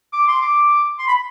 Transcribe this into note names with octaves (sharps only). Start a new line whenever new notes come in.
D6
C6
D6
C6
B5